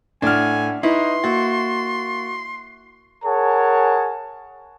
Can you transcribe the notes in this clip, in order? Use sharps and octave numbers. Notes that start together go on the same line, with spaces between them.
A2 D4 E5 F#5 G#5 F6
D#4 E4 B4 C6 C#6
A#3 F#4 A6
G#4 A#4 C#5 F#5 G#5 A5